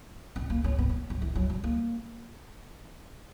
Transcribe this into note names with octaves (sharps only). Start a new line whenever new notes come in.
C#4
A#3
C#4
B3
B3
F#3
E3
F#3
G3
A#3